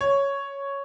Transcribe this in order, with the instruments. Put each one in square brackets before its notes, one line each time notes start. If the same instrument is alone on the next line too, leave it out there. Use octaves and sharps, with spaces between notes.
[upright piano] C#5